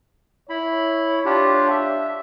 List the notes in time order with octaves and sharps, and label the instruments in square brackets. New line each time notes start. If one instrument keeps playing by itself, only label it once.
[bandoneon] E4 B5 [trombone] C#5
[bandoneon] D4 F4 G4
E5